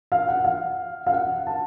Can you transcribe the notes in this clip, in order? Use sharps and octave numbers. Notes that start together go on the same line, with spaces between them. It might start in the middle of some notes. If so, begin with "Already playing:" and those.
F5
F#5
F5
F5
F#5
A5